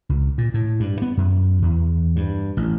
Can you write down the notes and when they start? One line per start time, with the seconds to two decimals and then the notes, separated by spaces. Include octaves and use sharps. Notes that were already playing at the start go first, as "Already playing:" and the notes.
0.09 C#2
0.38 A#2
0.54 A2
0.80 G2
1.02 B3
1.17 F#2
1.62 E2
2.16 G2
2.57 A1